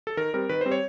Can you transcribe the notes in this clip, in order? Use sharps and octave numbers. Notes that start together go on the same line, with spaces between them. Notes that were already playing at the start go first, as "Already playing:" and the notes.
A4
D#3 A#4
G3 C4 A#4
D#3 B4
G3 C4 C5
C#5